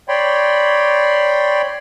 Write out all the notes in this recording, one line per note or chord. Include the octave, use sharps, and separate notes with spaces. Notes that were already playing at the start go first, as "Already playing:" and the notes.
C#5 D5 G5 B5 C6